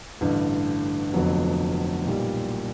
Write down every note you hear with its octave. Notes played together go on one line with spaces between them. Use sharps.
A1 G2 D3
F1 F2 D3 F#3 B3
B1 A#2 G3